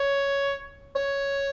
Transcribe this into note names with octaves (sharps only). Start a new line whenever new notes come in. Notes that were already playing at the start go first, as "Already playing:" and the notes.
Already playing: C#5
C#5